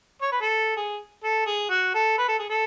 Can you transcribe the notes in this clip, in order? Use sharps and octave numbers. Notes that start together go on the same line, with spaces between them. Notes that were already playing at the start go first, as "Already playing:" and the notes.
C#5
B4
A4
G#4
A4
G#4
F#4
A4
B4
A4
G#4
A4